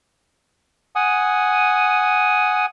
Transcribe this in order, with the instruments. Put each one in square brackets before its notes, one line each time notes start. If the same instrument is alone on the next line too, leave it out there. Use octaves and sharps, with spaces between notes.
[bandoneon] F#5 G#5 D#6